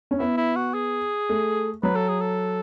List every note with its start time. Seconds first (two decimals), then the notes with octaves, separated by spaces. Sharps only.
0.11 C#4
0.19 B3 E4
0.37 E4
0.56 F#4
0.74 G#4
1.29 A3
1.83 F#3 B4
1.95 A4
2.09 G#4
2.20 A4